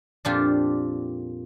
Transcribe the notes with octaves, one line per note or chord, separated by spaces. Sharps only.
F2 A#2 D4 F4 G4